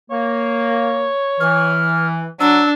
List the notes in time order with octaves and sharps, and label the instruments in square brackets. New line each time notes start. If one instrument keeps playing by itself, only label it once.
[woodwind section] A#3 [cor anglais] C#5
[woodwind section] E3 [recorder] F6
[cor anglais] F#3 [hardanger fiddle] D4 [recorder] E6